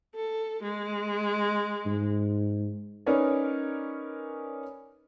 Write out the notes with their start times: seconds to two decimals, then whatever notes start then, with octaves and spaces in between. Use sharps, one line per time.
0.15 A4
0.63 G#3
1.86 G#2
3.06 C#4 D#4 A#4 B4 C#5 D5